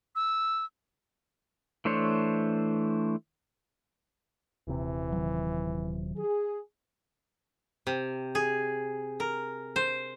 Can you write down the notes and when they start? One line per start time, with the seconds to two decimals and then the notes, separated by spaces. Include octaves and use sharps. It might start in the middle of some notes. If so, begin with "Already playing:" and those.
0.16 E6
1.85 E3 A3 D4 C5 C#5
4.67 D#1 C3 E3
5.12 D#3 F#3
6.17 G#4
7.87 C3
8.35 G#4
9.20 A#4
9.76 C5